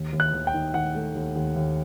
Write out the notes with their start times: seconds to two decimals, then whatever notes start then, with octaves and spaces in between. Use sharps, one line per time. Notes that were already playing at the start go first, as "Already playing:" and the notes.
Already playing: D#2
0.13 D#2
0.20 F#6
0.33 D#2
0.47 G5
0.54 D#3
0.74 D#3 F#5
0.95 A3
1.15 D#2
1.36 D#2
1.56 D#2